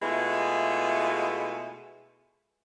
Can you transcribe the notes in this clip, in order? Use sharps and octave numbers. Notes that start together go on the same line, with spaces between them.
B2 G#3 A3 B3 E4 F4